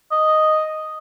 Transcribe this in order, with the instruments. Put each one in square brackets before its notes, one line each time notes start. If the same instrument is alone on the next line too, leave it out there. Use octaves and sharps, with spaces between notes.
[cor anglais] D#5